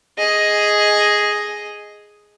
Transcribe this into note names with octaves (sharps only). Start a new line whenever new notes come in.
G#4 D#5